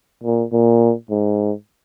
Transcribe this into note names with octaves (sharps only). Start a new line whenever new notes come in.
A#2
A#2
G#2